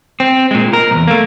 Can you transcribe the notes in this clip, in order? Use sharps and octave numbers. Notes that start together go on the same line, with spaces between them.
C4
A#2 G#3
A#4
B1 E2
A3 A#3